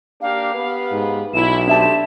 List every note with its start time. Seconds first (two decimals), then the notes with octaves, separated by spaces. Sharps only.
0.22 A#3 D4 G4 F5
0.53 B3 G4 B4
0.92 G#2
1.34 B1 E4 E7
1.68 A3 C4 D4 G4 E5 A5